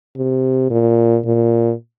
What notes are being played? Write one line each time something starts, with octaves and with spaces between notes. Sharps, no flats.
C3
A#2
A#2